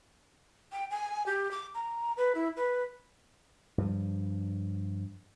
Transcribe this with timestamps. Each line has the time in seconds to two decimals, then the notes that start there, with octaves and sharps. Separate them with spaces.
0.72 G5
0.91 G#5
1.26 G4
1.51 D6
1.75 A#5
2.17 B4
2.35 E4
2.57 B4
3.78 G2 F3